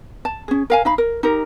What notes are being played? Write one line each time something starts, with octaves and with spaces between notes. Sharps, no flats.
A5
C#4 G#4
A#4 F5 G#5
D#4 F5 B5
A#4
D#4 G4 A#4